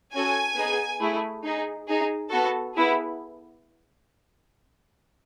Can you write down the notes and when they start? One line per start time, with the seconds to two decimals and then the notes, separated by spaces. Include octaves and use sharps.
0.13 C#4 F#4 A4 G#5
0.56 B3 D#4 G#4
1.00 A3 E4 G#4
1.44 D#4 G#4
1.87 D#4 G#4
2.30 B3 F#4 A4
2.74 B3 E4 G#4